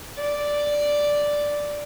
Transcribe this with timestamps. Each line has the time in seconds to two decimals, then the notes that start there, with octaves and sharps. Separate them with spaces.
0.17 D5